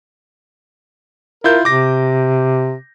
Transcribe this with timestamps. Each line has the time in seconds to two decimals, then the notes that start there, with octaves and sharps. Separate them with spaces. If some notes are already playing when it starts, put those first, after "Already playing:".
1.44 E4 F4 A#4 G6
1.65 C3 D6 A#6